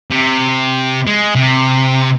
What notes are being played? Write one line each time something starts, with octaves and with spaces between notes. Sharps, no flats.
C3
G#3
C3